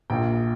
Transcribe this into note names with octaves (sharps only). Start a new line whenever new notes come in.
A#1 A#2 G5